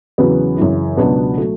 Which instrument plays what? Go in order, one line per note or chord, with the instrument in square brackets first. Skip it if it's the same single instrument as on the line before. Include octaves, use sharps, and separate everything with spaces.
[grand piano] E2 C#3 F#3 B3
F#2 C#3 E3
C#2 B2 F#3 B3 D4
F#3 A3